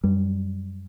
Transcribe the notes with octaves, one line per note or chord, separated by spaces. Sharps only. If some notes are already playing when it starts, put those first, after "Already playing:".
F#2 G3